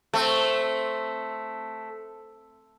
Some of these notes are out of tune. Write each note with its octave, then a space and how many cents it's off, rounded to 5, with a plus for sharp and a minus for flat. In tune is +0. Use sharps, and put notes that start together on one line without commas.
A3 +0 C4 +0